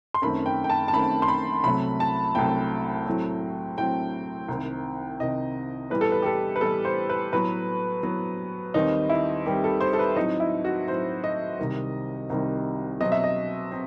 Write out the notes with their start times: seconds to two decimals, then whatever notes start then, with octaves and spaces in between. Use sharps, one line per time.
0.14 C6
0.22 F#2 D#3 A3 C4 B5
0.46 G5
0.64 G5
0.69 A5
0.88 A5
0.93 F#2 D#3 A3 C4 B5
1.22 C6
1.28 B5
1.64 C2 C3 F#3 A3 B5
2.00 A5
2.35 C2 C3 F#3 A3 G5
3.06 A2 F#3 A3 C4
3.77 A2 F#3 A3 C4 G5
4.48 C2 C3 D#3
5.20 C2 C3 D#3 D#5
5.90 A2 E3 G3 B3 B4
6.01 A4
6.12 B4
6.22 G4
6.26 A4
6.56 B4
6.61 A2 E3 G3 B3 A4
6.85 C5
7.10 B4
7.32 A2 F#3 B3 B4
8.03 A2 F#3 B3
8.74 D#2 D#3 G3 C4 D#4
9.10 E4
9.46 D#2 D#3 G3 C4 G4
9.64 A4
9.81 C5
9.93 A4
9.99 B4
10.16 A2 F#3 C4 D#4
10.40 E4
10.65 F#4
10.87 A2 F#3 C4 C5
11.24 D#5
11.59 C2 C3 D#3 G3
12.30 C2 C3 D#3 G3
13.01 B2 F#3 C4 D#5
13.12 E5
13.24 D#5
13.71 C4